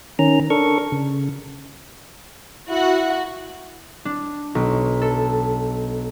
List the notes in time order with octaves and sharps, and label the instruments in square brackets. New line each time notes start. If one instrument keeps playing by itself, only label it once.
[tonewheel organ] D#3 C#4 A#5
D4 A4 A#4 C#6
C#3
[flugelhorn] E4 [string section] F#4
[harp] D4
B1
A4